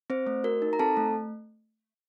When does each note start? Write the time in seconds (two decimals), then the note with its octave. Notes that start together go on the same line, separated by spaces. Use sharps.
0.10 C4 C5
0.27 A3
0.44 F#4 A#4
0.62 D#4
0.73 A#5
0.79 C4 A4 A5
0.97 A3